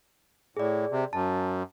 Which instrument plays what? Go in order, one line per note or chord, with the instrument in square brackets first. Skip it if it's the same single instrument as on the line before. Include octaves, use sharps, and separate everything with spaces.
[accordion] A2 [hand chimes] G#4 D5
[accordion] C3
[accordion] F#2 [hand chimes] A5